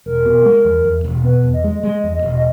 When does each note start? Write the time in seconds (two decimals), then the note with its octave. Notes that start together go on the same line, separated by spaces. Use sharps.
0.06 E1 A#4
0.26 B2
0.45 G#3
0.65 E2
0.85 E2
1.04 E1
1.24 B2 B4
1.43 E2
1.53 D#5
1.64 G#3
1.83 G#3 D#5
2.04 E2
2.13 D#5
2.22 E1
2.36 D#5